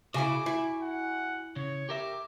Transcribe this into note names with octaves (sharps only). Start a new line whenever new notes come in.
C#3 E4 F#4 G#5 D6
E4
F#5
C#3 C#5
G4 A#4 E5 D6